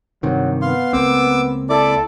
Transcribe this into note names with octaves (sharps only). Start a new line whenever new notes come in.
G2 C3 D#3 F#3
B3 F5 C6
C#2 A#3 C4 D6 E6
E4 A4 D5 D6